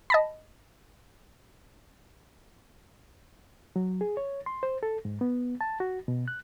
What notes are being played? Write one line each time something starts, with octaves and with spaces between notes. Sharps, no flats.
D#5 A5 B5
F#3
G#4
C#5
C6
C5
A4
G#2
B3
A5
F#4
B2
F#6